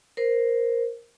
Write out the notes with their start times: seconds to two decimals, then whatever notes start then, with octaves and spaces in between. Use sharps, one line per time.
0.17 A#4 C5